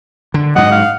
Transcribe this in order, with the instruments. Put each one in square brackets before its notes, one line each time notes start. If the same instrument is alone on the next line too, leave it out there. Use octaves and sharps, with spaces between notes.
[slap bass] D3
[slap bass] G#2 F#3 [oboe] D#5 [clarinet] F#5
[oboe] F5